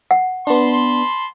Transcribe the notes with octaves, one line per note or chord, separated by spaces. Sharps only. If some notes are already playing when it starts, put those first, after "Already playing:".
F#5
B3 D4 A5 B5 C6